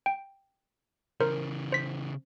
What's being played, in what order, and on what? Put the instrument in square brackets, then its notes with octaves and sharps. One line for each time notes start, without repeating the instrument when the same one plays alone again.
[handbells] G5
[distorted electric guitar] C#3 E3 [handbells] A#4 C5
[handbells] C5 B6